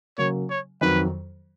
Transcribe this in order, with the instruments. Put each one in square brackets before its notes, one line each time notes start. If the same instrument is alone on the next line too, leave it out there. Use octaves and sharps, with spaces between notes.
[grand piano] C#3 F#3 A#3 [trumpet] C#5
[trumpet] C#5
[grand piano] F2 D#3 F#3 [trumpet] B4